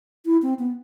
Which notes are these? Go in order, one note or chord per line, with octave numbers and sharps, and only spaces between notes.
E4
C4
B3